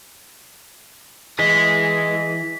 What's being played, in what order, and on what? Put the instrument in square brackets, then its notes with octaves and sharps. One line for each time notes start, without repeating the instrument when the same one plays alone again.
[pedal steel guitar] E3 [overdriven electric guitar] G#4 D#5 [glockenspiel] B6